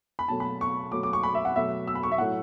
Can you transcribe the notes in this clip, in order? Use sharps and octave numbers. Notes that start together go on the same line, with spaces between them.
B5
B2 F#3 A3 A5
B5
C#6
B2 F#3 A3 D6
D6
C#6
B5
E5
F#5
B2 F#3 A3 E5
E6
B5
C#6
E5
A2 F#3 A3 F#5